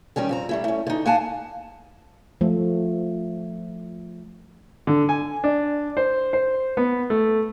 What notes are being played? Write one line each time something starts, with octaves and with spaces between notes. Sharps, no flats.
D#3 G3 C#4 G4
F2 C4 A#5
G3 A3 E4
A3 C#4
D3 D#4
A#3 F5 F#5 G#5 A5
F3 A3
D3
G#5
D4
C5
C5
B3
A3